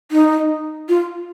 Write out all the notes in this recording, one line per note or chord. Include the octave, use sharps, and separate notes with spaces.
D#4
F4